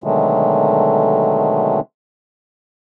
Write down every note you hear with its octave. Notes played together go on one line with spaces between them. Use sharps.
B2 D3 D#3 F#3 G#3 A3